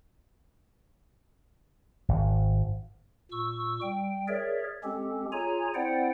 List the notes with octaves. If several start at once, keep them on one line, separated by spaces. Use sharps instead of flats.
G#1
A#2 C#6 E6
G3 G5
G#4 A#4 C#5 D5 E5
G#3 C4 C#4 G4 A4
F4 G#4 C#5 G#5 A#5
C4 E4 C5 D5 F#5 G5